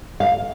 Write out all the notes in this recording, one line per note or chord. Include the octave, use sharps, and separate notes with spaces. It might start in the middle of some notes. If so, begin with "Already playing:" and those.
F5